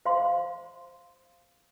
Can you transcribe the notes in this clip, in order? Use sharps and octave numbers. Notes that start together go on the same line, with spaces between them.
C5 F5 C6